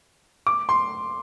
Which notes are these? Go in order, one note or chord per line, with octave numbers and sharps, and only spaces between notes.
D6
C6